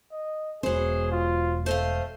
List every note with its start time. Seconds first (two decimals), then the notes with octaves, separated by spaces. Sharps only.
0.11 D#5
0.63 E1 F#3 G#3 B3 G#4 C5
1.12 F4
1.66 A3 C5 D#5 F5